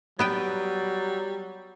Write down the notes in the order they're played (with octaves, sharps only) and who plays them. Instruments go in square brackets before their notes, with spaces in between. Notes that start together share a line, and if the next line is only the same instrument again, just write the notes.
[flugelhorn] F#3 [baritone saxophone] G3 [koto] B3 B4 G5